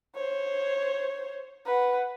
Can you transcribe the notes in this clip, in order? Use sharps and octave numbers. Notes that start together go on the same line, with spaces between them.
C5 C#5
B4 F#5